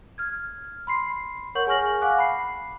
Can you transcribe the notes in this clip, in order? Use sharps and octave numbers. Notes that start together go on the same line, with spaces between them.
F6 G#6
B5 C6 C7
A#4 C#5 F#5 C#6 G6 F#7
G#4 G#5 C#6 F6 A#6 F#7
F5 F#5 G#5 D6 F#6
B5 C7